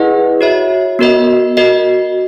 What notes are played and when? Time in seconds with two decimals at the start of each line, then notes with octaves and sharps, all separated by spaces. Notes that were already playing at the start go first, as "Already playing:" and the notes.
Already playing: E4 G#4 B4 D#5 F#5
0.41 F#4 C#5 E5
0.99 B3 F#4 A#4 D#5
1.57 F#4 A#4 D#5